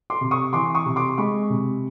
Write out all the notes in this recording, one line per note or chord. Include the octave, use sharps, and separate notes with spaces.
C6 D6
C3
C#6 D#6
E3 C6 D6
C#6 D#6
C3
C6 D6
G#3 B5 C#6
C3